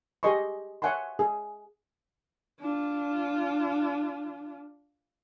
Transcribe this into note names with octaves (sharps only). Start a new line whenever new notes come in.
G4 G#4 D#5 C6 C#6
C#5 E5 F#5 G#5 A5 C6
G#4
D4 F4